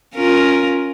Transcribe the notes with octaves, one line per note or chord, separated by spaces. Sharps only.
C#4 F4 A#4